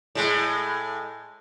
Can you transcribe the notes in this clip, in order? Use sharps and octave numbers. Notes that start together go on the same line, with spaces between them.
A2 G#3